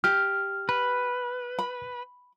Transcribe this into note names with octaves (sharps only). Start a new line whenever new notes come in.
G4 F6
B4
B5